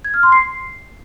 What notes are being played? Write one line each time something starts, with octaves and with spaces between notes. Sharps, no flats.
G#6
F6
C6
C7